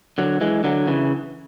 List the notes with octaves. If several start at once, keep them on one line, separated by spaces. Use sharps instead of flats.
D3 F#3
E3 G#3
D3 F#3
C#3 E3